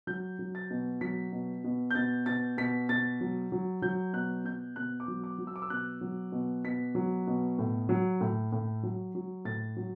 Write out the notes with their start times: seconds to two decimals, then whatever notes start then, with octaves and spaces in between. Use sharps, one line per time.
0.07 F#3 G6
0.39 F#3
0.55 A6
0.71 B2
1.01 F#3 B6
1.32 B2
1.64 B2
1.91 G6
1.95 B2 A6
2.26 B2 A6
2.57 B2 B6
2.89 B2 A6
3.21 F#3
3.52 F#3
3.82 F#3 G6
4.13 B2 F#6
4.45 B2 G6
4.76 B2 F#6
5.00 D6
5.08 F#3
5.24 D6
5.38 F#3
5.47 E6
5.56 D6
5.62 E6
5.70 B2 F#6
6.01 F#3
6.32 B2
6.65 B2 B6
6.95 F#3
7.27 B2
7.58 A2
7.89 F#3
8.21 A2
8.52 A2
8.83 F#3
9.15 F#3
9.45 A2 A6
9.77 F#3